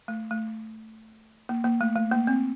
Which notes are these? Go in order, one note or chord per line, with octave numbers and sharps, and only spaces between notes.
A3
A3
A#3
A#3
A3
A3
A#3
C4